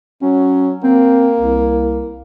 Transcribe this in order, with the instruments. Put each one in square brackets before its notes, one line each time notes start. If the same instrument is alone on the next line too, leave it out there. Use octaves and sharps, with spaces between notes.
[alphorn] F#3 [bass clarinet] C#4
[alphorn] A#3 [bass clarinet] C4
[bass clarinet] C2